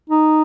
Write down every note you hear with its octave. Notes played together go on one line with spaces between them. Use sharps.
D#4